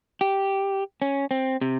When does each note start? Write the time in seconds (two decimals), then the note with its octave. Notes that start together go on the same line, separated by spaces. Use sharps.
0.21 G4
1.02 C#4
1.31 C4
1.61 C3